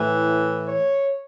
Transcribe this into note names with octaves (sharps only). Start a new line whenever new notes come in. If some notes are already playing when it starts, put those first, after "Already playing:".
Already playing: A2 E3
C#5